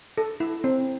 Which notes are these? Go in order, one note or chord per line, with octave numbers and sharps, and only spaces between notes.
A4
E4
C4